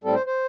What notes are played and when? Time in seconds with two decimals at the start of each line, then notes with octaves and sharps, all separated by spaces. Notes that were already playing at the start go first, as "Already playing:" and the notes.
0.04 A2 G3 C4 A4
0.15 C5
0.26 C5